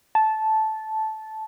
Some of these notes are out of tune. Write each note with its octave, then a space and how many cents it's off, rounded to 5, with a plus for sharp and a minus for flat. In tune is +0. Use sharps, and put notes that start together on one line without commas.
A5 -10